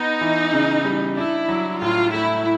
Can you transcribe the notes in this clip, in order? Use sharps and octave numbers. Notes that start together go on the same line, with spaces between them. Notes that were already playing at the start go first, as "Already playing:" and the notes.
Already playing: B3 D#4
E3
C#3
G3
D4 E4
F#3
A2 F4
A3 E4